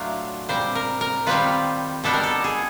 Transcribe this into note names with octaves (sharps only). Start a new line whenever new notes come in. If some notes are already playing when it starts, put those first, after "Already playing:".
Already playing: A2 F#3 A3 D4 F4
A#2 G3 C4 C5
A#4
A#4
D#3 G3 C4 F4 B4
B2 G3 B3 D4 A4
A#4
A4
G#4